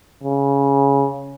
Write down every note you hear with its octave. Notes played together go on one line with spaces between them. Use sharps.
C#3